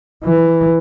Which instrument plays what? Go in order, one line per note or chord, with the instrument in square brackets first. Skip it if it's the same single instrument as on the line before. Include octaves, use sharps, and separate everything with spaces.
[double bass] E3